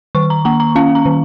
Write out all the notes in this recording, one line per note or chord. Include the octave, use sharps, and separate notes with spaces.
D#3 C#6
A#5
A#3 A#5
A#5
C#4 F5
A#5
D#3